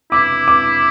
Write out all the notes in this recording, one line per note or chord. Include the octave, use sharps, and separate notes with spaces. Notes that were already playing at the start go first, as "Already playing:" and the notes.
E4 D6
D6